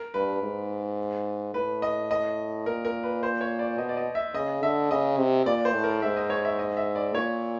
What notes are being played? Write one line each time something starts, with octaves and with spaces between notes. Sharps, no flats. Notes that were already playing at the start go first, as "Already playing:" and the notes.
Already playing: A#4
G2 B4
G#2
A2 B4
D#5
D#5
A#2 A#4
A#4
B4
C5
C#5
D5
B2 D#5
D5
D#5
E5
C#3 D#5
D3 E5
C#3 D#5
C3
A#2 D5
C5
A2
A#4
G#2 E5
D#5
C#5
E5
D#5
E5
D5
A#2 C#5